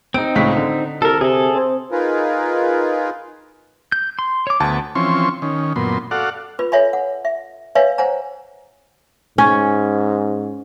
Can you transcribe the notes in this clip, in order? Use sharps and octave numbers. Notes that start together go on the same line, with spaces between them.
C4 D#4 D7
C#2 A2 B6
D3
C2 A4 A#4
C3 G#4 A4
C4
D#4 F4 G#4 A#4 B4
G6
C6
C#5 D6
D2 B3 A5
E3 F3 C4 C#4 C6 C#6
D#3 C#4
F#2 A#2 B3 C6
F#4 A4 D5 F5 F#5
F4 B4 B5
A4 C#5 E5 G#5 B5
F#5
E5
B4 C#5 E5 F5 G#5
C5 F#5 G#5 A#5
G#2 C#4